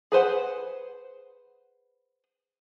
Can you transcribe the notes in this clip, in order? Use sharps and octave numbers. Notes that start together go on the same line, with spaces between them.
G#4 B4 C5 F#5